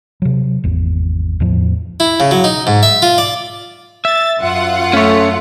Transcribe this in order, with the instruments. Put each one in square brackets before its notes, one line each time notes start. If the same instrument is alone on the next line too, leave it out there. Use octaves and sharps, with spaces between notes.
[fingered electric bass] C3 F#3
G#1 E2
E2 A2 F3
[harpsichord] E4
C#3
F#3
D#4
G#2
E5
F4
D5
[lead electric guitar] E5 [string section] A6
[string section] F#2 F4 F#5
[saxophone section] A3 [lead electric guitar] C#4 C#5